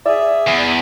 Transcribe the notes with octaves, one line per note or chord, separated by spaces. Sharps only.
G#4 D5 E5
E2